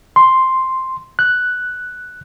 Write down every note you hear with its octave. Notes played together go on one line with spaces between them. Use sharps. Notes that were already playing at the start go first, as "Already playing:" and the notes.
C6
F#6